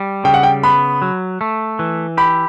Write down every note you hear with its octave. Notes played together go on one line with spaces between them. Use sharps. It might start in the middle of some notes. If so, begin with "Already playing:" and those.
Already playing: G3
C#3 G5
F#5
G5
B3 B5
F#3
A3
E3
G4 B5